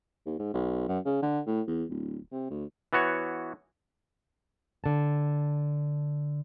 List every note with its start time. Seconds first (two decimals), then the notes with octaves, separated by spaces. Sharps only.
0.26 D#2
0.39 G#2
0.54 B1
0.88 F#2
1.06 C#3
1.22 D3
1.47 A2
1.67 E2
1.90 D1
2.32 C3
2.50 D2
2.93 E3 B3 F#4 C#5
4.84 D3 A5